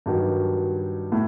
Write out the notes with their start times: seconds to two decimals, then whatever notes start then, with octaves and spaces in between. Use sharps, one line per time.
0.06 G2 D#3 F#3
1.12 A2